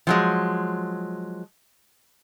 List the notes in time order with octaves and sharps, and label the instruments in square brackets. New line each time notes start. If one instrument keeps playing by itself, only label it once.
[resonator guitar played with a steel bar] F3 F#3 G#3